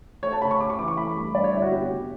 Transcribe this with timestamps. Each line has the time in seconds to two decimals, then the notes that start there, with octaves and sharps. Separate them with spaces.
0.23 A3 C#5
0.32 A5
0.42 C#3 B5
0.51 C#6
0.61 C#3 D6
0.70 C#6
0.79 E3 D6
0.88 C#6
0.97 A3 B5
1.16 G2
1.34 G2 D5
1.44 C#5
1.53 D3 E4
1.62 F#4
1.72 B3 G4
1.90 C#3